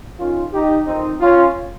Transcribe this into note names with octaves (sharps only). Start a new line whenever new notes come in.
D#2 D#3 C#4 F4
D#4 G4
F2 D#3 C4 D#4
C#4 F4